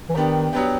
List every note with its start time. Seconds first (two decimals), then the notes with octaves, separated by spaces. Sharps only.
0.09 E3
0.15 D#3 B3 D4 G4
0.53 F#3 B3 D4 G4